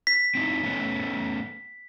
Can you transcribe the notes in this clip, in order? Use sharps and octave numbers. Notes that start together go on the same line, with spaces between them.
B6
C4 D#4 E4
A3 B3 C#4